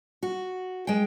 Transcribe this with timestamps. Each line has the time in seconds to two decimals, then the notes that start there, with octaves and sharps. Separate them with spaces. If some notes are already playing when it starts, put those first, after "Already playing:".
0.23 F#4
0.87 G#3 G5